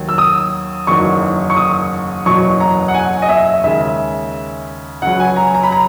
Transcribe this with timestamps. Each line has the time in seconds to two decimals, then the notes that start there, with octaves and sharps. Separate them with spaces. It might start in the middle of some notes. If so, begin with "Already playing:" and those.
Already playing: D#2 D#3 F#3
0.09 E6
0.18 D#6
0.87 F#1 E2 D#3 F#3 C#6
1.50 C#6
1.57 D#6
2.26 F#1 E2 B2 F#3 C#6
2.60 A#5
2.88 F#5
2.94 G#5
3.22 D#5
3.29 E5
3.64 D#2 C#3 G#3 E5
5.02 C#2 C#3 F#3 F#5
5.20 G#5
5.37 A#5
5.54 A#5
5.63 B5
5.72 A#5